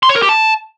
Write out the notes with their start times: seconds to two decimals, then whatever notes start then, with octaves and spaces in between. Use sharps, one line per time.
0.03 C6
0.09 C#5
0.16 A#4
0.22 G4
0.29 A5